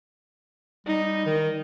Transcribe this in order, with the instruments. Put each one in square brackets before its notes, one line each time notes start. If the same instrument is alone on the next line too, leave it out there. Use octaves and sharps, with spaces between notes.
[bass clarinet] G3 [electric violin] D#4
[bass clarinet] D#3